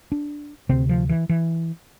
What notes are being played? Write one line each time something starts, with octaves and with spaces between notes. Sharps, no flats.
D4
D2 C3 C4
F3
E3
E3